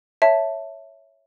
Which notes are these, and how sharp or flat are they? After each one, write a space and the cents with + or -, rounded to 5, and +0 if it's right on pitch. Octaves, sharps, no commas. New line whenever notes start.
C#5 +0 E5 +0 A5 +0